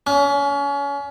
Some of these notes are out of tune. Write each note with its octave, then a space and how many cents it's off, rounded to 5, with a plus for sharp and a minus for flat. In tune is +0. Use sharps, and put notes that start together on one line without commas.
C#4 +30